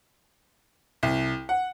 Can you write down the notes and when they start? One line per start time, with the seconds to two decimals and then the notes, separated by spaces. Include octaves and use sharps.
1.03 C2
1.49 F#5